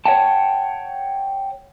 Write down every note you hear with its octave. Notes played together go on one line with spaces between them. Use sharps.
C#5 E5 F#5 G5 A5